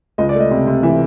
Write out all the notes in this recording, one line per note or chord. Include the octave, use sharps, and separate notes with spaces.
C#2 D#5
D5
A3
D#5
C3
C3
E3 E5